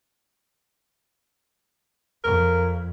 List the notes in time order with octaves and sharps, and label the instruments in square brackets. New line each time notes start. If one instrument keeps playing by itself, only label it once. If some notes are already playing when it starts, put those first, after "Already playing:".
[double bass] F2 [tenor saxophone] A#4